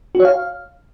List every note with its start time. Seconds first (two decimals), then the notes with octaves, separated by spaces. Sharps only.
0.15 F#4
0.20 C#5
0.25 F5